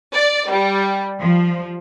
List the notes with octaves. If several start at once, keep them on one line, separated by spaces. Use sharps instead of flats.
D5
G3
F3